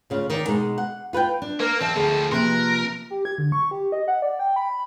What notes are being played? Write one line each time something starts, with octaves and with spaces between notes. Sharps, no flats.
D2 C#3 F4
D#3 D5
B2 G#3 D#4
F#5
F4 B4 F#5 G5
D4
A#3 A#4 B4
E2 C4 D#5 F5 A5
D2 A2 F3 G#4
C3 F3 A#3 A#4 B4 C6
G4
G#6
D3
C#6
G4
D#5
F#5
D5
G5
B5